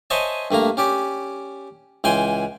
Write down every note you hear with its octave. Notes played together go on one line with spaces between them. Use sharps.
C5 C#5 D#5 E5 G#5 A5
G2 A3 A#3 A#5
C#4 G4 D5
C#2 E3 G5 G#5 C6